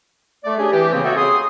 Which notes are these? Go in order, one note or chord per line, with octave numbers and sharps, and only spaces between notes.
A3 D5
C#4 D4 G4 G#4
E3 G4
C#3 A#3 C4
F#4 A4 C#5 D#5 E5 G5
C#3 G#4 C6 D#6